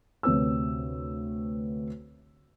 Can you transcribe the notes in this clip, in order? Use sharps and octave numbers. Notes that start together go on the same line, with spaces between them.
D2 C3 C4 B4 C#5 E6